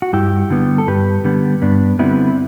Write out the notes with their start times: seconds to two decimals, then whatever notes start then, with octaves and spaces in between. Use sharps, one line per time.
0.02 F#4
0.13 G2 E4 G4
0.50 D3 G3 B3
0.78 A4
0.87 G2 G4 B4
1.25 D3 G3 B3
1.62 G2 B3 D4
1.99 D3 G3 B3 C4 E4